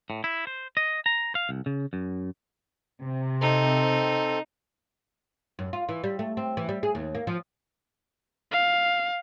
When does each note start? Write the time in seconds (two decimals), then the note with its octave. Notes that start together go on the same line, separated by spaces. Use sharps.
0.10 A2
0.24 E4
0.47 C5
0.77 D#5
1.06 A#5
1.35 F5
1.49 C2
1.66 C#3
1.93 F#2
3.03 C3
3.42 C4 D#4 A4
5.59 F#2
5.73 F4
5.89 E3
6.04 G3
6.19 A3
6.37 C4
6.57 E3
6.69 G3
6.83 G#4
6.95 D#2
7.15 A#3
7.27 F3
8.51 F5